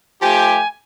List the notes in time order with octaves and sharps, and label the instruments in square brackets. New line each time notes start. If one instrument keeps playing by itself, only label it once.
[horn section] F3 A3 G4 [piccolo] G#5